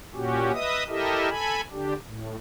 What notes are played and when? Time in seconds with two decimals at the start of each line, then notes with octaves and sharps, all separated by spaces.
0.14 A#2 C#4 F#4 G4
0.53 B4 D#5 E5 D#6
0.88 E4 G4 A4 A#4 D#5 E5
1.29 A4 G#5 B5
1.71 D3 D4 G4
2.05 A2